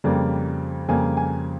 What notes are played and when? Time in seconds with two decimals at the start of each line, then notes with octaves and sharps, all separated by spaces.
0.04 F2 C#3 G3 A#3
0.88 F2 C#3 G3 A#3 G#5
1.17 G#5